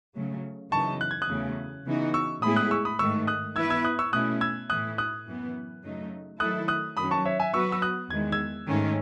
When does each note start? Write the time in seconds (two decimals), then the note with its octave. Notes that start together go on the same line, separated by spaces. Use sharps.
0.15 C#3 F#3 A3
0.72 F#2 C#3 E3 B3 D#4 A5 C#6
1.01 F#6
1.11 G#6
1.22 D#6 F#6
1.29 E2 C#3 F#3 A3
1.86 C#3 E3 B3 D#4 F#4
2.14 C#6 E6
2.42 A2 G#3 B3 E4 G#4 B5 D#6
2.56 D#6 F#6
2.71 C#6 E6
2.85 B5 D#6
2.99 G#2 D#3 A3 C#6 E6
3.27 D#6 F#6
3.56 E3 B3 E4 B4 E6 G#6
3.70 E6 G#6
3.84 D#6 F#6
3.99 C#6 E6
4.13 B2 A3 C#4 E4 D#6 F#6
4.41 E6 G#6
4.70 A2 E3 A3 E4 D#6 F#6
4.98 D#6 F#6
5.27 F#2 E3 B3
5.83 F#2 C#3 F#3 A3 D#4
6.40 D#3 F#3 A3 E4 A4 D#6 F#6
6.68 D#6 F#6
6.97 F#2 D#3 F#3 C#4 B5 D#6
7.11 A5 C#6
7.25 C#5 E5
7.39 E5 G#5
7.54 F#3 B3 F#4 B4 C#6 E6
7.72 E6
7.82 D#6 F#6
8.10 E2 D#3 G#3 G#6
8.32 E6 G#6
8.68 G#2 D#3 A3 C#4